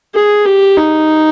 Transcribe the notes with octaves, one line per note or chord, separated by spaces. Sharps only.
G#4
G4
D#4